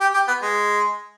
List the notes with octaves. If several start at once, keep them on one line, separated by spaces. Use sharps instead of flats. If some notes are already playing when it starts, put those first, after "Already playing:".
G4
G4
B3
G#3